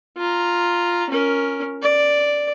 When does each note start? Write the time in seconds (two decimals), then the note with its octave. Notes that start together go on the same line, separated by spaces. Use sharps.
0.17 F4 A#5
1.10 C#4 A#4
1.82 D5